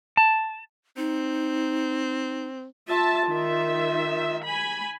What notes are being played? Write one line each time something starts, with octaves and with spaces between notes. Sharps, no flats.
A5
C4 D#4
F4 E5 A5
D#3 E5
G#5 B5